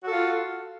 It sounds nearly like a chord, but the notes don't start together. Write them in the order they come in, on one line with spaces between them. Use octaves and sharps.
F#4 A4 F4